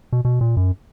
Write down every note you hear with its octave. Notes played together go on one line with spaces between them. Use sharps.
B2
B2
A#2
F#2